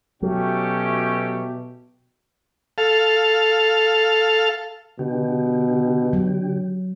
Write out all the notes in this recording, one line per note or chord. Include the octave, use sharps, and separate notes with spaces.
B2 F#3 A3 C#4 G4
A4 F5
B2 D3 G4
F#3